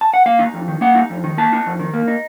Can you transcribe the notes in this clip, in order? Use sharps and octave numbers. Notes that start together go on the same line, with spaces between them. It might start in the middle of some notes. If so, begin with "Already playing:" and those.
A5
F#5
A#3 F5
D#4
F2
D#3
A#3 F#5
D#4
F2
D#3
A#3 A5
D#4
F2
D#3
A#3
D#4